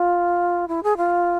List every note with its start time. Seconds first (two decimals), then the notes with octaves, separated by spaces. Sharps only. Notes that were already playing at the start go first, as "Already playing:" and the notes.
Already playing: F4
0.68 E4
0.83 G#4
0.97 F4